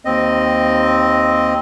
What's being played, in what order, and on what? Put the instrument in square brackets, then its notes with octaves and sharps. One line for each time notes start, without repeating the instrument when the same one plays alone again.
[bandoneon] D#2 C4 D#5